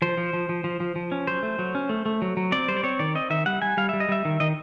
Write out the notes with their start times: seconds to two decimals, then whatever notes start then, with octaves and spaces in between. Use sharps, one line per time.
0.02 F3 C5
0.17 F3
0.33 F3
0.49 F3
0.64 F3
0.80 F3
0.96 F3
1.12 C#4
1.27 F#3 C5
1.43 A3
1.59 F#3
1.75 C#4
1.89 A3
2.06 A3
2.22 F#3
2.37 F#3
2.52 C4 D5
2.68 G3 C5
2.77 D5
2.84 C4 C#5
2.99 D#3 D5
3.15 C4 D#5
3.30 D#3 E5
3.46 G3 F#5
3.62 G3 G#5
3.77 G3 F5
3.89 G3 E5
4.00 D#5
4.09 G3 E5
4.25 D#3
4.40 D#3 D#5